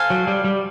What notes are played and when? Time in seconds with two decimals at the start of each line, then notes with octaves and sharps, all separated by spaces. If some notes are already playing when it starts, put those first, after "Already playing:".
Already playing: A4 C5 F5 G#5
0.10 F#3
0.27 G3
0.44 G3